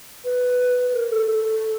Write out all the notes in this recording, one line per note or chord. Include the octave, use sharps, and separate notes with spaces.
B4
A#4
A4
A4